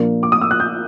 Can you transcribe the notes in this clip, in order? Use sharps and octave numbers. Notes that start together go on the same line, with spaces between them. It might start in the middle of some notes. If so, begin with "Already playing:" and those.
Already playing: A#2 F3 A#3 D4
D6
D#6
E6
F#6
G6